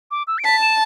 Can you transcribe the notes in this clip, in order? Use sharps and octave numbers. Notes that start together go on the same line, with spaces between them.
D6
E6
D7
A5 B6
E7